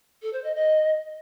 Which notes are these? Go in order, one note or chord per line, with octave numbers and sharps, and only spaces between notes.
A4
C5
D#5
D#5